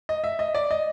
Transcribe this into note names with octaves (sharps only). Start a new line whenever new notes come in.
D#5
E5
D#5
D5
D#5